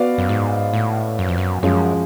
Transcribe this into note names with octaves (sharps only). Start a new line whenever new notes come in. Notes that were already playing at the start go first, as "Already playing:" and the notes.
Already playing: B3 F#4 B4 D5 F5
F#2
G#2
A2
F#2
F2
F#2
F#2 F3 G#3 C#4